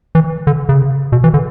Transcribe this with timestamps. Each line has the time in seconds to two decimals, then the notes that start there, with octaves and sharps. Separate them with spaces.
0.15 E3
0.47 D3
0.69 C#3
1.12 B2
1.24 E3
1.34 D3